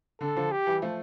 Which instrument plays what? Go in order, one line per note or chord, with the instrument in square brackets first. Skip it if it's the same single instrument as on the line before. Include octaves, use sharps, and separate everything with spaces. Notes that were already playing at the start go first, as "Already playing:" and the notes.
[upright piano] D3 [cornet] A4
[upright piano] D3 F3
[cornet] G4
[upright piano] E3 G3
F3 A3